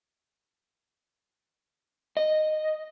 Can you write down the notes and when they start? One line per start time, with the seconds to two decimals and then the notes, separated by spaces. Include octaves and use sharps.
2.17 D#5